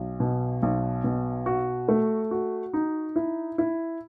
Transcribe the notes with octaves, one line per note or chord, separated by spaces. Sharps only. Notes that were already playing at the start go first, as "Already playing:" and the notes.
Already playing: B1
B2
B1
B2
F#4
A3
F#4
D#4
E4
E4